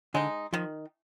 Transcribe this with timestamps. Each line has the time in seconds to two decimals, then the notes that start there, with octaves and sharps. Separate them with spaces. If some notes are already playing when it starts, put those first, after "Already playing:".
0.14 D3 G#3 D#4
0.53 D#3 F3